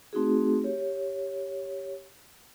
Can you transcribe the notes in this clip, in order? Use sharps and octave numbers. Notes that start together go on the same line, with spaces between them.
A3 C4 D#4 F#4 G#4
G4 C#5